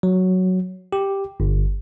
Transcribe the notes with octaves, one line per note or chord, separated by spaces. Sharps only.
F#3
G4
G1